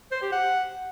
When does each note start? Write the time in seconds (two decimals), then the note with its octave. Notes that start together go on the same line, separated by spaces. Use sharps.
0.12 C5
0.22 G4
0.32 F#5